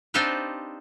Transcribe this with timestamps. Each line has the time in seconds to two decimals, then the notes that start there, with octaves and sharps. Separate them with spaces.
0.14 C4 D4 D#4 F4 G4 B4